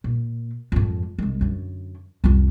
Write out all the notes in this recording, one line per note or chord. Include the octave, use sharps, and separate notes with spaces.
A#2
F2 G#2
C2 G#3
F#2 D3
C2 F2